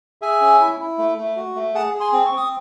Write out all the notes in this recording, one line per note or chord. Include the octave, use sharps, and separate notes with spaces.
G#4 E5 G#5
C#4
E4
E4
A3
A3
F#4
A3
G#4 F#5 A5
G#4
G#5 C6
C4
C#6
C4 D#6